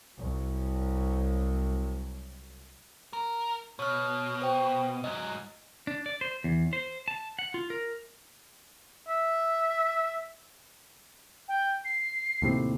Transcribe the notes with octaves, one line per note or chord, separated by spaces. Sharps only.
C2 F#3
A#4
B2 C#5 F6
C5 G5
G#2 F#3 D#5
D4
D5
C5
E2
C5
A5
F#5
F4
A#4
E5
G5
C7
D#2 A2 C3